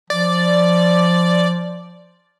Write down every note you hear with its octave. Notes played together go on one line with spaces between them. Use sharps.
F3 D5